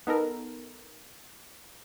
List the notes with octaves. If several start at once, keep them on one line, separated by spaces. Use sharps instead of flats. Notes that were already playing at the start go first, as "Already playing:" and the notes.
B3 D#4 A4 A#4